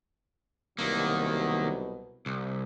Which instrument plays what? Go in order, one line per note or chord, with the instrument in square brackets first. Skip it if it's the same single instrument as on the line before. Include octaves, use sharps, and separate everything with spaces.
[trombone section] C2 B2 F#3 [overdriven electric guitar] D#3 A#3
[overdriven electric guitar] C2